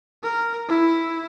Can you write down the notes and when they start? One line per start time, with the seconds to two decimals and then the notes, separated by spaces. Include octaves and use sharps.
0.24 A#4
0.69 E4